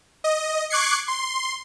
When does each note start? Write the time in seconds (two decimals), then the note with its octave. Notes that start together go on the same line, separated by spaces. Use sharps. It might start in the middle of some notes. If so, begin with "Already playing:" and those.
0.24 D#5
0.70 C#6 D6 F#6 G#6 C7 C#7
1.08 C6